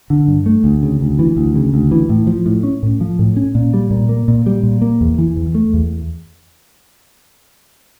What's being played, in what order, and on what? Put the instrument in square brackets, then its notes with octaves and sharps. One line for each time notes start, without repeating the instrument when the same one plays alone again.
[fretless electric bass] D3
G2
A3
D2
C#3
D2
E3
D2
C#3
D2
E3
A2
F3
A2
C#4
A2
F3
A2
C#4
A#2
G3
A#2
A#3
A#2
G3
A#2
A#3
E2
E3
E2
A3
E2